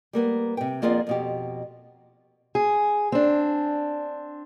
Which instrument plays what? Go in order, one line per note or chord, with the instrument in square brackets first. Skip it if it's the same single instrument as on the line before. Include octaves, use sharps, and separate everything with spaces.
[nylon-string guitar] G3 A#3 B3
C3 G5
F2 A#3 F4 G#4 D5 F#5
F2 B2 G4
[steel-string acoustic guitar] G#4
C4 D4